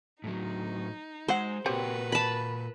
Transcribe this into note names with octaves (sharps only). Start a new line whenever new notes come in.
A2 F#3 D#4
F#3 G#3 C5 F#5
A#2 C4 F#4 G4 A#4 B4 C#5
A5 B5